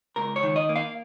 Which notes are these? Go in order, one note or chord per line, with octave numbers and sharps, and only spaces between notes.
C#2 A#4
C#5
D#3
D#5
A#3
F5